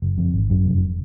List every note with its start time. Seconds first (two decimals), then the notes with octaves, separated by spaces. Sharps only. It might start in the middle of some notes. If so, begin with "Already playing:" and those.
0.02 F#1
0.18 F2
0.34 G#1
0.50 F#2
0.66 F1